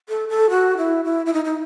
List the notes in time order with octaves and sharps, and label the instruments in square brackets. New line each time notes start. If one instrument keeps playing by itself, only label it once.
[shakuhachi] A4
A4
F#4
E4
E4
E4
D#4
D#4